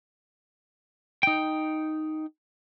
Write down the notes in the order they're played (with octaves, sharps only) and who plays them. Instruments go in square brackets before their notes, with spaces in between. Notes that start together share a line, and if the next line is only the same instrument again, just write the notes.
[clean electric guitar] D#4 G5